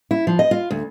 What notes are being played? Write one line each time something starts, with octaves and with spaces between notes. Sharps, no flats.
E4
F3
D#5
F4
D2